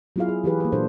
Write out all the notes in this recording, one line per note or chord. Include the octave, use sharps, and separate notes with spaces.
F#3 B3 E4 F4 G#4 F5
G#4
E3 G4 G#4 B4
A#3 B4
A#2 F#3 D4 A4 C5